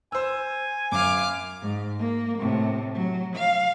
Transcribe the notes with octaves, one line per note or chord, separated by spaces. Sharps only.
C5 G#5 E6
F#2 F5 D6
G#2
A#3
A2 C3
F#3
F5